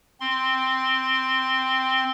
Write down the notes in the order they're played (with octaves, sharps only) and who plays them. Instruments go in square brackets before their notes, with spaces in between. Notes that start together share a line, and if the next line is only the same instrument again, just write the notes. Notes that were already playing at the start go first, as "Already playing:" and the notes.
[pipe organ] C4 C6